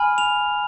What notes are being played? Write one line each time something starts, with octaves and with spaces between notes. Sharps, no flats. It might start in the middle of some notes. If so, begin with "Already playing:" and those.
Already playing: G#5 B5 F6
F7